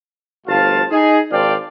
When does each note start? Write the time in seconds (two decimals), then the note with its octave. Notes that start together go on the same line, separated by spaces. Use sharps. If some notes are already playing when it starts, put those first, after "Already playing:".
0.47 G1 D2 F3 F4 F5 A5
0.91 D#4 G#4
1.31 G#1 D4 C5 D5 F5 G5